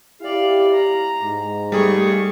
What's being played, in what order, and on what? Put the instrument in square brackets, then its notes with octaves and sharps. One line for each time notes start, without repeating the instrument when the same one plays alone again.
[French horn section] E4 G4 [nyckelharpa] D5 F5
[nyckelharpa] A#5
[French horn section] G#2
[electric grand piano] G3 G#4 [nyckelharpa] A3 C#6